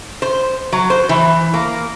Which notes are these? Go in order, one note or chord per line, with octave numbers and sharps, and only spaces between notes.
C5
F#3
C5
E3
A#3